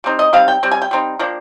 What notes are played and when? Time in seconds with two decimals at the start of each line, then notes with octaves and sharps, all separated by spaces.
0.04 G3 C4 D#4
0.19 D#5
0.33 G3 C4 D#4 F5
0.48 G5
0.63 G3 C4
0.71 G#5
0.82 G5
0.91 G3 C4 D#4
1.19 F3 A#3 D4